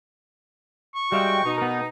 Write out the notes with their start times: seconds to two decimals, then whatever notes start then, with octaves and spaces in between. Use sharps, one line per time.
0.95 C#6
1.12 G3 G#3 F#4 E5 F5 G5
1.45 B2 D#4
1.58 B3 A#4